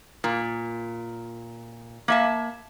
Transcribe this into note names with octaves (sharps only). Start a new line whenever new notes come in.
A#2
A#3 E5 A5